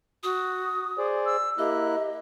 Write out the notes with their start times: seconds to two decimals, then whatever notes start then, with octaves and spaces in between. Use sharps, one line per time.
0.23 F#4 D#6
0.98 G#4 C5 D5
1.26 E6
1.58 A#3 E4 G4 D#5 F#6